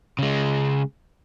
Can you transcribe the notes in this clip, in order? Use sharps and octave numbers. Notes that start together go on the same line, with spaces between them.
C#3 G#3